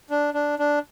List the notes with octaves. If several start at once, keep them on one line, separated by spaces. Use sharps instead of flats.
D4
D4
D4